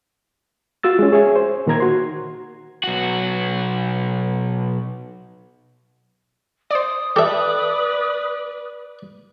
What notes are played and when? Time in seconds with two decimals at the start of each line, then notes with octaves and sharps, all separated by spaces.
0.83 F4 F#4 E6 A6
0.99 G#3 C#4
1.12 G#4 C#5 E5 G#5
1.36 C5
1.67 A#2 D#3 A#3 A#5 G#6
1.80 F#4 C6
2.84 B1 F#4
6.71 C5 D5 D#6
7.16 G4 A4 B4 D5 E5